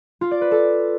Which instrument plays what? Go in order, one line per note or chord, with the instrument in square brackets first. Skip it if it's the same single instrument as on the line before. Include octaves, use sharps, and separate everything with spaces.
[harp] F4
D5
B4
A4